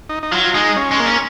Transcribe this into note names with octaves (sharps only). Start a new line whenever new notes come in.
D#4
D#4
F#3 F4
F4
G#3 D#4
C#4
G#3
A#3
C#4